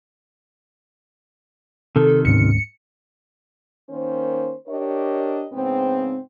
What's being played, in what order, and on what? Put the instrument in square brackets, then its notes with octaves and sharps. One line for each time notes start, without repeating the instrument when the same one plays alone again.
[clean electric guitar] C3 D#3 [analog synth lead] A4
[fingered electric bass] D1 G#2 C#4 [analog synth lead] C#7
[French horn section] D#3 A#3 C#4 C5
D4 G4 A#4 C#5 D#5
G#2 C#3 B3 C4